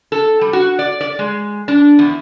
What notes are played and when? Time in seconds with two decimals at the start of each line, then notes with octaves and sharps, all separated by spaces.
0.12 A4
0.41 G3
0.53 F#4
0.79 D5
1.01 D5
1.19 G#3
1.68 D4
1.99 E2